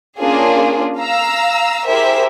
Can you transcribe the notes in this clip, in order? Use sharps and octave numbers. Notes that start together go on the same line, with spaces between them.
A#3 C#4 D4 F4 G#4
F5 A#5 E6
E4 G4 G#4 A#4 C5 E5